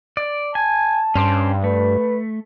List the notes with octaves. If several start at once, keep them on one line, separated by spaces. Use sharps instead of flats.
D5
G#5 A5
G2 C#4 C5 D5
A3 B4